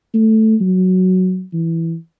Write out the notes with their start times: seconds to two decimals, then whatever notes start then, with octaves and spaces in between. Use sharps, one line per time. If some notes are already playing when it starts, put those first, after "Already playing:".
0.14 A3
0.61 F#3
1.53 E3